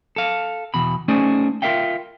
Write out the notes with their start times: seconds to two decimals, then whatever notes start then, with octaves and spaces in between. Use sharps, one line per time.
0.16 A4 F5
0.74 E2 B2 B5
1.08 A3 C#4 D#4 G#4 C5 D5
1.62 F4 F#4 A#4 E5 F5 G5